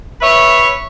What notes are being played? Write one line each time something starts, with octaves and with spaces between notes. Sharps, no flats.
B4 C#5 E5